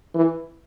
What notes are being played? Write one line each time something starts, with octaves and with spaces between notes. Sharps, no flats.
E3